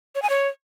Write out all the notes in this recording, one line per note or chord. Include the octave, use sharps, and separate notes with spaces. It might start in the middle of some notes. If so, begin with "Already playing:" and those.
C#5
G#5
C#5